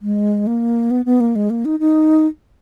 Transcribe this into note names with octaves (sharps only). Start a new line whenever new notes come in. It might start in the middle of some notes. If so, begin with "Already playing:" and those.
G#3
A#3
B3
B3
A#3
G#3
A#3
D#4
D#4